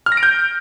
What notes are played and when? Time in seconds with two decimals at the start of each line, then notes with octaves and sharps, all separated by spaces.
0.06 F6
0.12 A#6
0.17 D7
0.23 G6